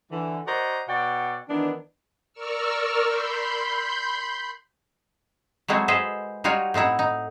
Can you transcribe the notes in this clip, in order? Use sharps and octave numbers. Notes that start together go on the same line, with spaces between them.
D3 E3
F#4 C5 D5 D#5 A#5
B2 C#5 D5 F#5 G5
D#3 E3 B3 D4
A#4 D5 C#6 E6 F6
B5 C6 G6
F#3 G#3 A3 C4 E4 F#4
G#4 B4 C5 D#5 E5
G3 D#4 F4 F#4 C#5 G#5
A2 C4 D#4 E4 F#5
D#4